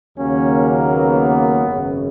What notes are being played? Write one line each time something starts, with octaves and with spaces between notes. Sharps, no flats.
D#2 C#3 F#3 A#3 C#4
B3
G#1 F#2 C#3